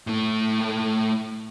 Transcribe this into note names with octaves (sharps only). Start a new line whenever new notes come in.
A2 A3